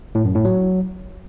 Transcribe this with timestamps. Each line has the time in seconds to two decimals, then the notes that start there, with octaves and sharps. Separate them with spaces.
0.15 A2
0.25 F#2
0.35 A2
0.45 F#3